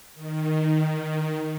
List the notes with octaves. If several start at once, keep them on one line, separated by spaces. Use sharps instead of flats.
D#3